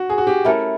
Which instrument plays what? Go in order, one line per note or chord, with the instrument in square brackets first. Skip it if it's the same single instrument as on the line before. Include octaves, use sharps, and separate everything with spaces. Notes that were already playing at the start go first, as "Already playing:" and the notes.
Already playing: [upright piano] F#4
G#4
F#4
G4
[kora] A3 C#4 E4 [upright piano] A#4